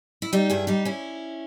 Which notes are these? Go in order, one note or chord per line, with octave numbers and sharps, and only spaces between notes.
E4
G3 D#4 G4
G2 E4 G#4
G3 D#4 G4
C#4 E4